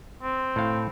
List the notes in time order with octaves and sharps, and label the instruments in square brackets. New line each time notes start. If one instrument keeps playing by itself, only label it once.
[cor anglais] C4
[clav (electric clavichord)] A2 F5